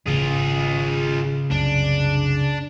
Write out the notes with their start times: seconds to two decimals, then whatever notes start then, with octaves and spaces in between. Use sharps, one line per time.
0.06 F#1 E2 A2 C#3 F4 G#4
0.21 G#1
1.51 C2 F#2 C3 D4